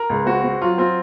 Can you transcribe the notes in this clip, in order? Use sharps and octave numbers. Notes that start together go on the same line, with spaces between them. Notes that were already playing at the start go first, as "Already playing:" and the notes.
Already playing: A#4
C#2
C4 F#4
C4
F#3 F4
C4 F4